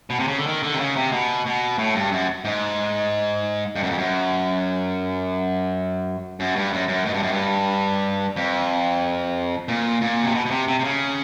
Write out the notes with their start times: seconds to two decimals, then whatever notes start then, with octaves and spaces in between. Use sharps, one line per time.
0.10 B2
0.19 C3
0.28 C#3
0.38 D3
0.47 D#3
0.63 D3
0.73 C3
0.79 C#3
0.96 C3
1.12 B2
1.46 B2
1.78 A2
1.95 G2
2.12 F#2
2.45 G#2
3.75 G2
3.83 F#2
3.90 F2
3.98 F#2
6.40 F#2
6.56 G2
6.73 F#2
6.88 F#2
7.06 G#2
7.14 G2
7.23 F#2
7.32 G2
8.36 F2
9.68 A#2
10.02 A#2
10.23 C3
10.35 B2
10.46 B2
10.51 C3
10.68 C3
10.79 C3
10.84 C#3